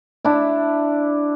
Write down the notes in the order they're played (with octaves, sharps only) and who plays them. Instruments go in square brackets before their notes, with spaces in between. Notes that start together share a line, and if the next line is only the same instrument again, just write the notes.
[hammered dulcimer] D4 E4